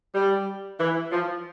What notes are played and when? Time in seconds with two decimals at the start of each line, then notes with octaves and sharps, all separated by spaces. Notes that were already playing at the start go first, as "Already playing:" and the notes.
0.15 G3
0.79 E3
1.11 F3